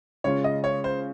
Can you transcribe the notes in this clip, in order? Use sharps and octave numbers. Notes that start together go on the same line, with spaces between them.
C#3 G#3 C#4 F4 C#5
D#5
C#5
C5